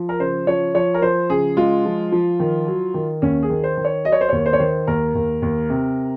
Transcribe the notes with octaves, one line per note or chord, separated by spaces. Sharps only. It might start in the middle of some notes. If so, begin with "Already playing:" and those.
Already playing: F3
A#4
C#3 C5
F3 C#5
F3 C#5
A#4
F3 C5
C#3 G#4
G#3 F4
F3
F3
D#3
F#3
D#3
D#2 C#4
G#4
D#3
C5
D#3
C#5
F#3 D#5
C#5
C5
D#2 C#5
C5
C#5
D#3 C5
D#2 A#4
D#2
D#2
C3